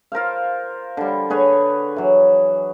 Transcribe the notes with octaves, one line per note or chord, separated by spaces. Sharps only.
F4 A#4 C5 F5
D3 G3
D3 G#4 B4 C#5
E3 F#3